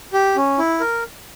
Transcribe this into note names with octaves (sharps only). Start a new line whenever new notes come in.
G4
C#4
E4
A#4